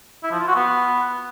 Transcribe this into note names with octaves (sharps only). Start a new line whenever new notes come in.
E4
F3
F4
F#4
B3